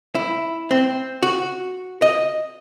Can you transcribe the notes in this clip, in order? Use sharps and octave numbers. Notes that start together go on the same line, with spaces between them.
E4
C4
F#4
D#5